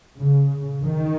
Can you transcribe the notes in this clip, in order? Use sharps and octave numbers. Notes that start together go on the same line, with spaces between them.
C#3
D#3